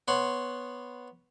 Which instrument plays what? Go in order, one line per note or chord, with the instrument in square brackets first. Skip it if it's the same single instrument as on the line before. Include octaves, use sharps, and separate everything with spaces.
[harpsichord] B3 C#5 F#5 C6